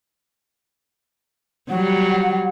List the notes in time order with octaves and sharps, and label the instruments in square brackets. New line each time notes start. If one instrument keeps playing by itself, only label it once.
[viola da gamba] F#3 G3 [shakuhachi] F#5